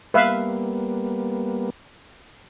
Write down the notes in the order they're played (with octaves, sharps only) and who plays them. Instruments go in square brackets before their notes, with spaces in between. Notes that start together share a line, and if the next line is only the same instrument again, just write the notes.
[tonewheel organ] G3 A#3 B3 [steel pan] B4 E5 F5